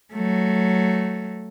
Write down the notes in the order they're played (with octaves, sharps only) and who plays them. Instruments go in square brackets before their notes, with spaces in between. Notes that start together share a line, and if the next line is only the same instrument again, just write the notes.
[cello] F#3 A3